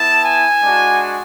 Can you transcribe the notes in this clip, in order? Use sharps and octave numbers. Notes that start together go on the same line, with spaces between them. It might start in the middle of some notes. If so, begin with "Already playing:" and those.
Already playing: B3 E4 A5
G#5
G#3 D4 F#4